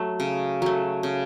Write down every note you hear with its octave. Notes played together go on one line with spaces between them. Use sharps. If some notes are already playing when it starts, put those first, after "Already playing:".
Already playing: F#3 A3
C#3
F#3 A3
C#3